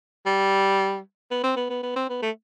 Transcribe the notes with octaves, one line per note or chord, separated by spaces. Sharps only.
G3
B3
C4
B3
B3
B3
C4
B3
A3